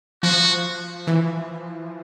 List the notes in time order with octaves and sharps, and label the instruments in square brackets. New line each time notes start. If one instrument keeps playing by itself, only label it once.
[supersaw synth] F3 [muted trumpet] F#4
[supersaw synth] E3